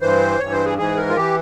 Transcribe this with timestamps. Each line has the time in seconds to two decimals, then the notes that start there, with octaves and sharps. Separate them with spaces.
0.01 G2 E3 C5
0.39 G2 E3 C#5
0.52 C5
0.65 G#4
0.78 G#2 E3 G#4
0.97 A#4
1.10 F4
1.16 E3 G4